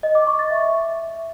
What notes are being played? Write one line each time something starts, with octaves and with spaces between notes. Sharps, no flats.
D#5
D6
C#6
A6
E5